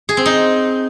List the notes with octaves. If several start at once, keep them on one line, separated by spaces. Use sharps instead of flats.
G#4
C4
D#4